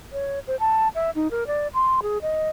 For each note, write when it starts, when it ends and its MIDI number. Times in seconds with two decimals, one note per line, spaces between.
0.13 0.39 73
0.47 0.56 72
0.60 0.88 81
0.95 1.10 76
1.15 1.30 63
1.31 1.47 70
1.47 1.68 74
1.74 2.00 84
2.03 2.18 68
2.22 2.49 75